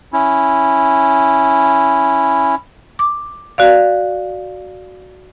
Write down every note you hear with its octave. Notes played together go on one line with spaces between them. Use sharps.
C#4 E4
D6
F#4 D5 F5